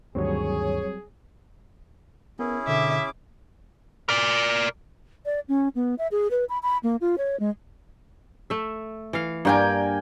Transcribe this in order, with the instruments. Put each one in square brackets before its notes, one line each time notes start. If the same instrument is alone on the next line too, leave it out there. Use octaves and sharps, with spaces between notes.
[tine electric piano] D2 G2 D#3 [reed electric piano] F#3 G3 C4 [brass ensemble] G#4 [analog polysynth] C#5
[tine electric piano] B3 A#4 [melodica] C#4 E4 G#4
[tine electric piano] B2 D3 [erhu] E5 [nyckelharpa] D6
[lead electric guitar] A#4 D5
[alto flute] D5
C#4
B3
E5
G#4
B4
B5
B5
A#3
F4
C#5
G#3
[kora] A3 E5
E3 F5
[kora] G2 D4 A#4 [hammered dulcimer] A#3 G5 G#5